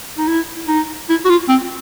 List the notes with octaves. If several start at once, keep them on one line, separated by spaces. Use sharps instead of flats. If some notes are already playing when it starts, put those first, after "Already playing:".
D#4
E4
D#4
E4
F#4
F4
C4